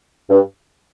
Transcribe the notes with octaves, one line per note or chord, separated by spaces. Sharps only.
G2